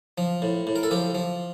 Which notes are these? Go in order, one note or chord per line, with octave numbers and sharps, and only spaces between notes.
F3
A2
A2
A#4
A4
F3 G4
F3